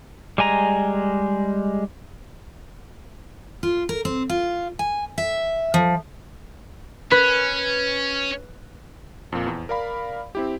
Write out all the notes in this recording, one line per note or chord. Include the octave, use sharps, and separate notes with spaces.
G3 G#3 G#5 A#5
F4
A#4
C4
F4
G#5
E5
F3
C#4 B4
F2 A#2
E2
A#4 D5 F5 B5
C4 E4 G4